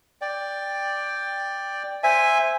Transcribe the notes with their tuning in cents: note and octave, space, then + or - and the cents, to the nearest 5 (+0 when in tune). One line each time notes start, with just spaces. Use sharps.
D5 +0 G5 +10
C5 +0 E5 +0 G#5 -10